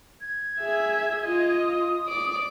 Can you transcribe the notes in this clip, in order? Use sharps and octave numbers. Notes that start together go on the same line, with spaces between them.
G#6
G#4 E5
F4 D#5
D#6
D5 D7